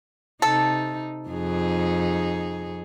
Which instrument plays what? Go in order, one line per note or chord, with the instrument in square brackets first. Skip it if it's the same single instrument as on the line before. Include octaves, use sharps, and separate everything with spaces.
[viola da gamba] C3 D#4 [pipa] A4
[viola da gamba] F2 D#4 G#4